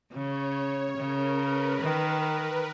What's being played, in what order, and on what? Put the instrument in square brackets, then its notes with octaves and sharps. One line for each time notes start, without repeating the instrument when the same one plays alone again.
[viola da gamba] C#3 [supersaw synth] C#5
[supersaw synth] C#5
[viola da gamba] C#3 [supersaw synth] A#4
[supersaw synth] B4
[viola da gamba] D#3